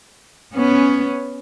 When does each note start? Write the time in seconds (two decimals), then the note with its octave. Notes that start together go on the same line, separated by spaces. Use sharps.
0.54 B3 C#4